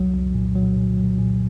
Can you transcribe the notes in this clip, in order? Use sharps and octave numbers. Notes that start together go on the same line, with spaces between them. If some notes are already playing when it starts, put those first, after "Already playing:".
Already playing: C2 F#3
C2
A#2
F#3
A#2
F#3
A#2